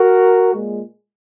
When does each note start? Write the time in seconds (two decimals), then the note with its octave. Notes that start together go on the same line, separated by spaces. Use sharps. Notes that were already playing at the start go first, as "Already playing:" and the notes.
Already playing: F#4 A#4
0.54 A#2 G#3